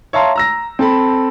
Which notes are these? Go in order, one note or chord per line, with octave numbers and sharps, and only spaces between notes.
C#5 E5 F5 A5 A#5 C6
A#5 E6 A#6
C4 A4 A5 B5